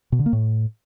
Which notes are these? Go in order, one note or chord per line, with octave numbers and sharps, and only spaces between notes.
B2
D3
A#3
A2